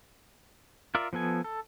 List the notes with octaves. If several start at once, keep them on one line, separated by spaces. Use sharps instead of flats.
F4 A#4 D5 E5
F3 B3 A4 G#5
A4